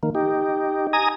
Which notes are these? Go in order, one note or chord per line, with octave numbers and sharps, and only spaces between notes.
D#3 A#3
D#4 G4
G#5 A#5 D#6